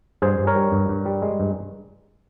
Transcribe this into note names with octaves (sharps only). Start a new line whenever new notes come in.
G2 G#4 C5
G2
A#4 C#5
G3
G2
G2
G3
G#3
G2